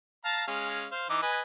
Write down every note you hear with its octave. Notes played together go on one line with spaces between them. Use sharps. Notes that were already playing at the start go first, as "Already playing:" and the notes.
F5 A5 A#5
G#3 C#4 F5
C5 F5
E3 D#4 D6
B4 D#5 G#5